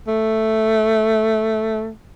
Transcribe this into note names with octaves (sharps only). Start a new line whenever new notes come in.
A3